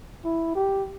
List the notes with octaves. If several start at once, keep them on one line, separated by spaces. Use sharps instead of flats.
E4
G4